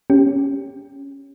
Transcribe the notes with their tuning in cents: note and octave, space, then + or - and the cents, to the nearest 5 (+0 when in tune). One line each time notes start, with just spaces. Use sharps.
C#4 +0 G4 +0